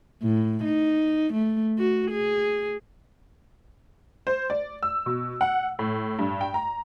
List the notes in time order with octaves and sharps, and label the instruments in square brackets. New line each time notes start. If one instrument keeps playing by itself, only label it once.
[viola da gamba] A2
D#4
A3
F#4
G#4
[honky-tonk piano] C5
D5
E6
B2
F#5
A2
G2
G5
A#5